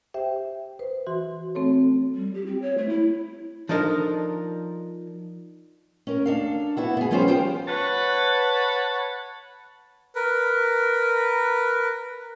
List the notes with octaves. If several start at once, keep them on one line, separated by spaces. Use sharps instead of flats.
G4 C5 E5 G5
B4 C5
E3 F#4 C6
A3 C4 A4 C#5
G3
G4
C4
C#5
A3
E4
F3 D4 D#4 A4 A#4
C#4 A#4
D4 A4 F5
B3 E4 F#4
B3 G#4
F3 G3 B3 C#4 G#4 C5
F4 G4 C5 G5
B4 C#5 F#5 A5 B5
A#4 B4